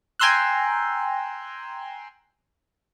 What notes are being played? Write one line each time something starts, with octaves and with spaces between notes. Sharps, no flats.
G5 G#5 A#5 C6 E6 F#6